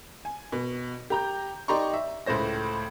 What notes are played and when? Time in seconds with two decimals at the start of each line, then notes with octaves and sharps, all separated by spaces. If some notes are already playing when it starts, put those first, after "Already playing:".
0.25 G#5
0.52 B2
1.10 G4 A#5 G6
1.68 D#4 G4 D5 A#5 C6 C#6
1.94 E5
2.26 C#2 A2 A3 C5 A#6